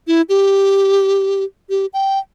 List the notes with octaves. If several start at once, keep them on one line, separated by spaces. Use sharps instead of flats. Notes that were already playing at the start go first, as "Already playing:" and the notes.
E4
G4
G4
G5